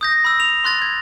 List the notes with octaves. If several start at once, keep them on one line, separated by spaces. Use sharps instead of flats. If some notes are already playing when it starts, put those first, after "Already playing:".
D#6 G6 A#6
B5 E6
F7
C6 F#6 A6
G#6